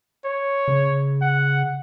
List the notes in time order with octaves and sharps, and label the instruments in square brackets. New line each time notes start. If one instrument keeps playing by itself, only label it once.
[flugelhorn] C#5
[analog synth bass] C#3
[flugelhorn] F#5